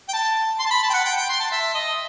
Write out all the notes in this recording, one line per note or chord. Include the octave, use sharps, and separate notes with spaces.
G5
A5
C6
A5
B5
A5
G5
F#5
G5
G5
C6
A5
E5
D#5